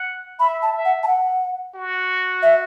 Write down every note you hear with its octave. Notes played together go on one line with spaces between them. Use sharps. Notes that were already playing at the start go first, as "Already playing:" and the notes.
Already playing: F#5
E5 B5
A5
E5
F#5
A5
F#5
F#4
E5